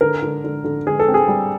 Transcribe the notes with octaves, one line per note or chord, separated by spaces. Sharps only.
D3 A#4
D3
D3
D3
D3 G#4
A4
C4
G#4
G3